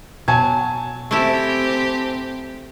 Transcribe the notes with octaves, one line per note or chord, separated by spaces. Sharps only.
B2 F#3 G#5 A5 G#6
A3 C4 E4 G4